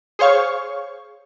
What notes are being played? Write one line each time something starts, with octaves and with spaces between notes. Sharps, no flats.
G#4 C5 C#5 F5 C#6